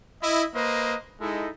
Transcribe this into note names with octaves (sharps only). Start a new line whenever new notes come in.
E4 D#5
A#3 B4 C5 D#5
G#3 D#4 E4 A4